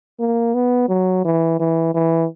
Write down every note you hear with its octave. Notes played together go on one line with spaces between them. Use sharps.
A#3
B3
F#3
E3
E3
E3